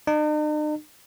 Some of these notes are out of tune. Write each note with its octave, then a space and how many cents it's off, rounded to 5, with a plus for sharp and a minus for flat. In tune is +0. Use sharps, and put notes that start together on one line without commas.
D#4 -45